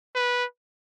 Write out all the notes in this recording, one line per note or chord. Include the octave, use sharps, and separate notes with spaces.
B4